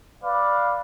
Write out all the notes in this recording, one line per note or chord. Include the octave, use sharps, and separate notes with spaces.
B4 D5 F5 D6